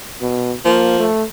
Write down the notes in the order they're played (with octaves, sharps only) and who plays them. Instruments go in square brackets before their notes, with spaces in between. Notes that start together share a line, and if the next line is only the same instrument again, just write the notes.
[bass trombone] B2
[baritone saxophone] F3 [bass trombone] A#3
[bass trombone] A3